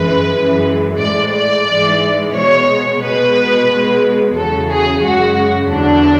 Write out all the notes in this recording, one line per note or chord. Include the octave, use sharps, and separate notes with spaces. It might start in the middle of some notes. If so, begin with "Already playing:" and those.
Already playing: F#2 E3 G#3 B4
F#2 E3 G#3
A2 G#3 D5
D5
G#2 E3 G#3
B2 G#3 C#5
B2 G#3 B4
B2 G#3
E2 C#3 F#3 A4
G#4
F#2 C#3 G#3 F#4
E2 D3 F#3 D4